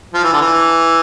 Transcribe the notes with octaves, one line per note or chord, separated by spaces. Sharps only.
F3
E3
D3
E3